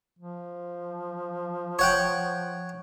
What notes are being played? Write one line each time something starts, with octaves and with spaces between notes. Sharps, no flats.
F3
C#5 F#5 G5